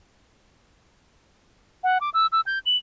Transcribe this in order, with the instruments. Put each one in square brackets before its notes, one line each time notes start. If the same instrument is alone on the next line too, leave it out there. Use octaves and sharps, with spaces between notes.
[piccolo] F#5
D6
E6
E6
G6
F#7